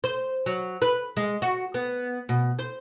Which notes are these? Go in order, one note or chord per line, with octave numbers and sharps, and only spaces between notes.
C5
F#3
B4
G#3
F#4
B3
B2
C5